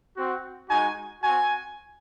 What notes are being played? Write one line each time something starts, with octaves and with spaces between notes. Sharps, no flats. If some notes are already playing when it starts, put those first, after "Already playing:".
C4 F#4
G#3 D#4 F#4 G#5
C4 F#4 G#5